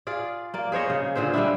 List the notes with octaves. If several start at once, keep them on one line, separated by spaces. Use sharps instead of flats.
F4 G#4 D5
A#3 D5
G#4 C5 C#5 D#5
C#3
A#2 D3 G#4 C5
G3 G#3 D4 E4